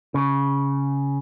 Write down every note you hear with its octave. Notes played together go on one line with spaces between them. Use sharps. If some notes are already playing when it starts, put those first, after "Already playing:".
C#3